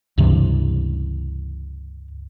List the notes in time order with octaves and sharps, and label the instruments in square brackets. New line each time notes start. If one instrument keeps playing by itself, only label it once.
[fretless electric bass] C#2 G2 C3 E3